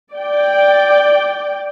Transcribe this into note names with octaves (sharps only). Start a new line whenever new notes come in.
D5 G5